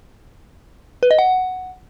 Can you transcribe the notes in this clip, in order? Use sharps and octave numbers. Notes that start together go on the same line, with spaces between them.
B4
D#5
F#5